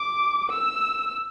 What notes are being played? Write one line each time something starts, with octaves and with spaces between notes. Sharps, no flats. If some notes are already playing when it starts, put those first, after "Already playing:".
Already playing: D6
E6